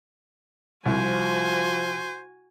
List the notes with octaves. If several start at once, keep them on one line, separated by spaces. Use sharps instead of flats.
C2 F3 F#4 C5 G#5